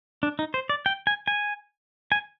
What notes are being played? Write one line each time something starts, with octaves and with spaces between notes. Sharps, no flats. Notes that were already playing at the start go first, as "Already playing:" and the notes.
D4
D#4
C5
D5
G5
G#5
G#5
G#5